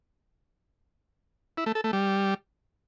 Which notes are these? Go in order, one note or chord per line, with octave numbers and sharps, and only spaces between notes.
E4
A3
A4
A3
G3